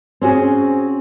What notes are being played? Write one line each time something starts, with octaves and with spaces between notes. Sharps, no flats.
C4 C#4 F#4 G#4